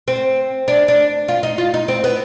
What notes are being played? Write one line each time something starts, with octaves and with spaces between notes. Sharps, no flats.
C4
D4
D4
F4
D#4
F4
D#4
C4
B3